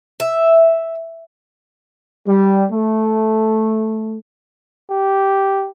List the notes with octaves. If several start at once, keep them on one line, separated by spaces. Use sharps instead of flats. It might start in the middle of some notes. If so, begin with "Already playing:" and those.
E5
G3
A3
G4